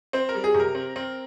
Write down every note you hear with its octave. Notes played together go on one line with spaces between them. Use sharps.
C4 C5
A#4
G3
G#4
C3
A#4
C4
C4